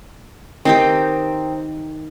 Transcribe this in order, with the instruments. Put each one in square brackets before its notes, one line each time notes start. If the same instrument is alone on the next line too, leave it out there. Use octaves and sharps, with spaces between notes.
[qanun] D#3 D#4 G4 [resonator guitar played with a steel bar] C4